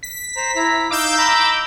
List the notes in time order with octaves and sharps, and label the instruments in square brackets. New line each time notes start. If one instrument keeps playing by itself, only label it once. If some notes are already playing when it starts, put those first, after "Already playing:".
[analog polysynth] B6
[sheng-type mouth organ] C5 A#5
E4 A#5
[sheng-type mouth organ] D#4 F5 [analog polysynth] D6 E6 G6
[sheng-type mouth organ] A#5 B5